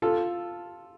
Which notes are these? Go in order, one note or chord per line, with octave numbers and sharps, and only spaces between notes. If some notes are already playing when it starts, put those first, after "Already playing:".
F4 A4